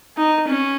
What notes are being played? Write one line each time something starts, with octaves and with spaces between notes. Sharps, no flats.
D#4
C#4